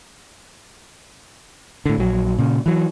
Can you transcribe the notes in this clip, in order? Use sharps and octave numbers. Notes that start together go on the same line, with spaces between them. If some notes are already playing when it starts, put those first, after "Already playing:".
A2 D3
A#1 F#3
A#2 C#3
E3 F#3